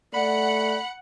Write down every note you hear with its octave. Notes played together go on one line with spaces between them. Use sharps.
A3 D5 F#5 B5